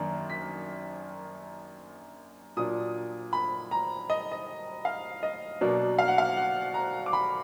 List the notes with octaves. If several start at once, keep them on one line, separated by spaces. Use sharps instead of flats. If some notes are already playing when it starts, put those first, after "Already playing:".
Already playing: F#2 D#3 A#3 D4
B6
A#2 F#3 D4 D#6
B5
A#5
D#5
D#5
F5
D#5
B2 F#3 A#3 D4
F5
F#5
F5
F#5
A#5
D6
B5